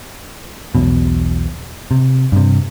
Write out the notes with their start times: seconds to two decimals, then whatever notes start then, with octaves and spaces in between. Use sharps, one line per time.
0.75 B1 E2 B2
1.91 C3
2.32 G2 C3